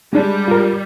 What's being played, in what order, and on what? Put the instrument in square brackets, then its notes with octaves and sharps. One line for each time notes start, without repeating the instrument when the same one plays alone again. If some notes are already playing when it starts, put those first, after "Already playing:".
[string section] G3 [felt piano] G#3 D4
[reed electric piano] F4 A#4